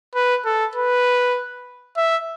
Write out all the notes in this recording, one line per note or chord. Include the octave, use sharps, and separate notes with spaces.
B4
A4
B4
E5